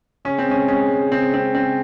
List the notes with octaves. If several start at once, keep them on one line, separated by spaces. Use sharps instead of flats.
C#3 C#4
C4
G#3 C#4
G#3 C#4
G#3
C#3 C4
G#3 C4
C#3 C4